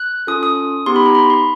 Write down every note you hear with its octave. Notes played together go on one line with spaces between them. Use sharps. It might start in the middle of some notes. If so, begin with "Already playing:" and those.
Already playing: F#6
C#4 F4 A4 D#6
D#6
B3 D#4 G4 C6
B5
A#5
B5
C6